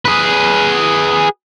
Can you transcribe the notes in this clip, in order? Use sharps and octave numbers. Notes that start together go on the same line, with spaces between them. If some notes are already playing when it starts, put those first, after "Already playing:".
G#4 B4